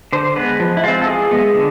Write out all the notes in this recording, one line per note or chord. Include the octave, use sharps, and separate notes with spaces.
D3 C5
G#3 B3 B4
F3
E4
G#3 C4 F4
A4
E3 G#4
G#3 B3
D3